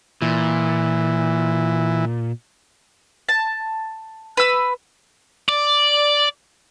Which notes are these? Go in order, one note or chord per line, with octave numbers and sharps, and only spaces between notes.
A#2 E3
A5
B4 E6
D5